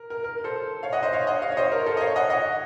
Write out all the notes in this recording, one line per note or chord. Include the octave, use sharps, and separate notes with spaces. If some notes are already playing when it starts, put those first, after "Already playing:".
Already playing: A#4
A#4
A#4
A4 C5
C#5 F5
D#5 F#5
C5 D#5
C#5 F5
D#5 F#5
C#5 F5
C#5
C5 D#5
A#4 C#5
A4 C5
D#5
C#5 F5
D#5 F#5
D#5 F#5